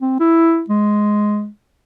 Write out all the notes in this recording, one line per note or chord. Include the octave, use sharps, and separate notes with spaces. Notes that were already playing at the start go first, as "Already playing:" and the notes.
C4
E4
G#3